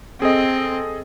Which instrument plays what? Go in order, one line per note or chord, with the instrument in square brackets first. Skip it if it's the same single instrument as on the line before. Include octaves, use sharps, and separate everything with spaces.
[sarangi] C4 [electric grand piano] G#4 A4 D#5